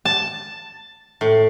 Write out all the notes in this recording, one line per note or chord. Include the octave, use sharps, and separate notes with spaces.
A5
A2